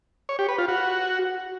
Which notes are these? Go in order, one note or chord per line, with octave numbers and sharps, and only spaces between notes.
C#5
G4
B4
F4
F#4